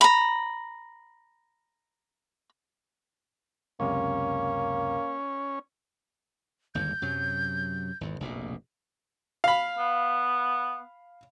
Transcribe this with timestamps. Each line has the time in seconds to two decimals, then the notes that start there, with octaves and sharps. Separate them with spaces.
0.01 A#5 B5
3.80 C#2 F#2 C3 A#3 C#4
6.75 G1 D#2 G#2 G6
7.02 F#2 C3 F#3
8.01 G#1 E2
8.20 F1 A#1 B2
9.44 F5 B5
9.78 B3